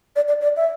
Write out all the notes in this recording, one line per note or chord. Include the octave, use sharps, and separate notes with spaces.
D5
D5
D5
E5